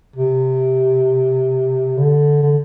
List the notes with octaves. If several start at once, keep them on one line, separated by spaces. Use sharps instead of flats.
C3
D3
D3